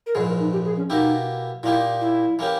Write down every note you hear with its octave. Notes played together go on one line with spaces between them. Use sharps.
A#4
A#1 G#2 E3 G#4
A#4
D#4
G4
G#4
C#4
B2 A#3 D#4 E4 G4
A#2 A#3 D#4 E4 G4
E4
E3 A#3 C#4 G4